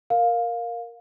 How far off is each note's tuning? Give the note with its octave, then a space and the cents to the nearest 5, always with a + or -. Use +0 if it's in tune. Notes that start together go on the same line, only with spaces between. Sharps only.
A#4 +0 F5 +10